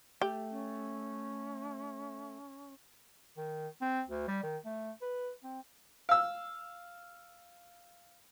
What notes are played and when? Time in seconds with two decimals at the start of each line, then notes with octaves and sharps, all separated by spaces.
0.22 A3 G4
0.50 C#4
3.37 D#3
3.81 C4
4.08 D2
4.28 G3
4.43 D#3
4.65 A3
5.02 B4
5.44 C4
6.09 F5 E6